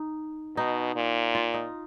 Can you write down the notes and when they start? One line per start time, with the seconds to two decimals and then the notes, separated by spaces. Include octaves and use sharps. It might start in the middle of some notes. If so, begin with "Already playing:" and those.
Already playing: D#4
0.56 B2 D#4
0.96 A#2
1.35 F4
1.54 D#4